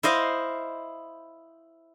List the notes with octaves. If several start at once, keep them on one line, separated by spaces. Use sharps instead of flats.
E4 C5 D#5 F5